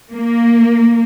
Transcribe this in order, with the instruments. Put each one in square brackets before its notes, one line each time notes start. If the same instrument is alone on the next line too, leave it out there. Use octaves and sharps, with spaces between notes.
[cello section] A#3